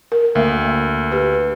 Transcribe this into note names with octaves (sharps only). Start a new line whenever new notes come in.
A#4
D2 A#3 E5 F5
G4 B4